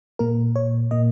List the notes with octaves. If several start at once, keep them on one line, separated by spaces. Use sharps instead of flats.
A#2 A#3 A#4
C#5
A#2 A#3 D#5